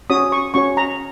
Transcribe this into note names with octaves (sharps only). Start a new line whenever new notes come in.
C#4 F#4 C#5 D#6
C#6
C#4 F#4 C#5 C#6
A#5